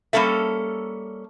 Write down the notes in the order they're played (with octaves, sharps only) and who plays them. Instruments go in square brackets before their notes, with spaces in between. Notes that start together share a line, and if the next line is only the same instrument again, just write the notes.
[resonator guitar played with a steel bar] G3 A#3 C#4 A4 E5